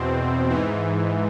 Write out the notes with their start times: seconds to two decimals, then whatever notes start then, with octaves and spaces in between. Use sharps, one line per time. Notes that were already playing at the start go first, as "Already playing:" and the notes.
Already playing: E2 B2 C4
0.50 G#2 E3